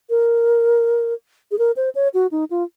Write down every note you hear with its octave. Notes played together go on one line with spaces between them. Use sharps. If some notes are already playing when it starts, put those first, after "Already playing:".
A#4
G#4
A#4
C5
C#5
F#4
D#4
F4